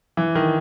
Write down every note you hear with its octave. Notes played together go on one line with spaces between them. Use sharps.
E3
D#3